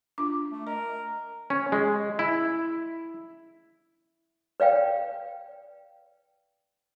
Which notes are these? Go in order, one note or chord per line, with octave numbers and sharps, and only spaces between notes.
D4 F4 D6
A3
A#4 D#5
C#4
G#3
E4
B4 D5 F5 G5